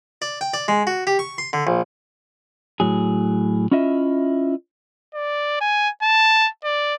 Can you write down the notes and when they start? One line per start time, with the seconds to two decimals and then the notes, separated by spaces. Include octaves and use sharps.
0.22 D5
0.41 G5
0.54 D5
0.68 G#3
0.87 F#4
1.07 G4
1.19 C#6
1.38 C6
1.53 D3
1.67 A#1
2.80 A2 F#3 G#4
3.71 C#4 E4 F4 D#5 E5
5.14 D5
5.61 G#5
6.03 A5
6.64 D5